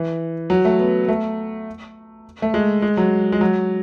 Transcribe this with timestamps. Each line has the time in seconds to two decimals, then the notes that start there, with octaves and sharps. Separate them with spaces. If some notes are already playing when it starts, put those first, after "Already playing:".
Already playing: E3
0.50 F#3
0.65 A3
0.79 B3
1.08 A3
2.42 A3
2.54 G#3
2.82 G#3
2.97 F#3
3.32 G#3
3.41 F#3